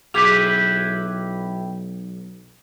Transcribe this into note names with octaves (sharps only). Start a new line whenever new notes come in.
B1 E4 G4 G#4 B4 D6